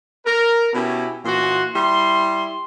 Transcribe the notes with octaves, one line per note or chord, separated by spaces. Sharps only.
A#4
B2 B3 C#4 E4 G4
A#2 E3 C#4 F#4 C6
G3 E4 C6